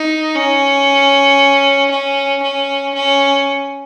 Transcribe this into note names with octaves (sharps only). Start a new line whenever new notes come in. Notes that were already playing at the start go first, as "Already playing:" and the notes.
Already playing: D#4
C#4
C#4
C#4
C#4